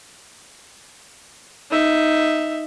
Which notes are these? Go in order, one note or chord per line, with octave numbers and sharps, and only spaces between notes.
D#4 E5